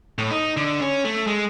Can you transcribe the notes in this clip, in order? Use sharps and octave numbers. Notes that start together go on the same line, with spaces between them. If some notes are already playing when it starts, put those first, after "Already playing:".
A2
D#4
D3
C#4
A3
G#3